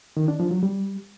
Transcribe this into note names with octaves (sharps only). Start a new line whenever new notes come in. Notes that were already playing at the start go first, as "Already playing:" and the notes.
D#3
D4
F3
F#3
G3